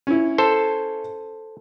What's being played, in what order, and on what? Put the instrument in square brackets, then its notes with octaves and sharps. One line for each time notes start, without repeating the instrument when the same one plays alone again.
[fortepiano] C#4 E4
[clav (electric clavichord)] A4 C5